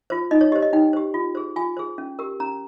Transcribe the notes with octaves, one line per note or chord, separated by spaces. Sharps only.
F4 C5
D#4 D#5
C#5
G4 C5 D#5
D#5
D#4 G5
G4 C5
F4
G#4 C5
F4 G#5
G#4 C5
C#4
G4 A#4
C#4 A#5